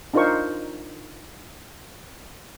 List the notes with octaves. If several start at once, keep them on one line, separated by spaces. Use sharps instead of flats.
D4 D#4 F4 A#4 C5 C#6